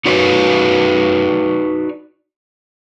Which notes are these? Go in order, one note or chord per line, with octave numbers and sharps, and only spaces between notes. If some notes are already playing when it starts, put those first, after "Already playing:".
D#4 F#4 B4 C#5 D5